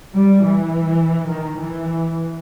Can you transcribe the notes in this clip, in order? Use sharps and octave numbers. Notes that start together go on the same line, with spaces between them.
G3
E3
D#3
E3